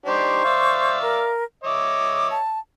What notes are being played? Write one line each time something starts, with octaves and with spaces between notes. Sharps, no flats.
D4 D#4 G4 C5 C#6
D5 E5 F5
A#4
C#5 D#5 E5 D6
A5